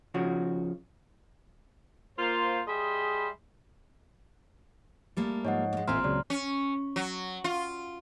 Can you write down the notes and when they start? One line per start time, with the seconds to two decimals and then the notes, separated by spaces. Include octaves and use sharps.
0.14 C#3 F3 F#4
2.19 A#3 F4 C5
2.68 G3 G#4 D#5 E5 B5 C6
5.17 G3 A3 A#3
5.45 G#2 F3 C#5 D#5 F#5
5.73 G#3 A#3
5.88 A1 A#2 C4 E5 G#5 A#5 C6 F6
6.04 C#2 C#3 F#3 D5
6.30 C#4
6.96 F#3
7.44 F4